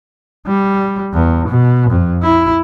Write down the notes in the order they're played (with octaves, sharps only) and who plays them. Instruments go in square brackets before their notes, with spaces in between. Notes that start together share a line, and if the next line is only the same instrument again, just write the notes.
[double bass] G3
E2
B2
F2
E4